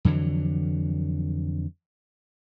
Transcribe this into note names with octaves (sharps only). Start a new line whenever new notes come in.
F2 D3 E3 F#3